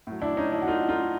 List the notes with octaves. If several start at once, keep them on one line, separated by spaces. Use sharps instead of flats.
A2 F#3
D4 E4
C#4 D#4
D4 E4
F#4
D#4 F4
D#4 F4